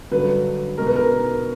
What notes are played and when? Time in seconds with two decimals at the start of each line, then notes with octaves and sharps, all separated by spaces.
0.11 G2 D3 F#3 B4
0.78 B2 G#3 A#4
0.87 B4
0.96 A#4